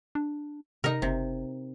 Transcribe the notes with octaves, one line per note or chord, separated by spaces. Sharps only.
D4
C3 D#4 A#4
F#1 C3